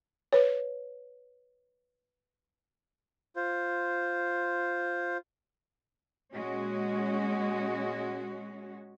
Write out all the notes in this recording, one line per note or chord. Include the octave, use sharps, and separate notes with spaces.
B4 C#5
F4 C5
A#2 G#3 C#4 F#4